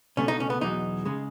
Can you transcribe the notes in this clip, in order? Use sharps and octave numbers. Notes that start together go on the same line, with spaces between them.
C#2 B2 A3 C#4
D#4
C#4
B3
E2 B2 F#3 D#4
C#3 G#3